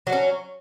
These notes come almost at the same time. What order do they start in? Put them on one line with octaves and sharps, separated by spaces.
F#3 F#4 C#4